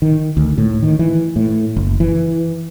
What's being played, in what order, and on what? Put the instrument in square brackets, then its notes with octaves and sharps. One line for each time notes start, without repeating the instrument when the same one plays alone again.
[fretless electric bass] D#3
D2
A2
D#3
E3
A2
F#1
E3